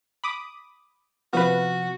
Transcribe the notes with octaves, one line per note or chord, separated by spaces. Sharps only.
B5 D6 D#6
C3 F3 B3 F#4 B4 F6